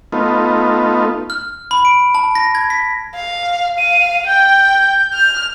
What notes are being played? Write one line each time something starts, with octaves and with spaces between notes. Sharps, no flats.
A3 B3 D#4 F4
F6
B5
D7
A5
A#6
G#6
B6
F5
F5 D#7
G5 G6
F6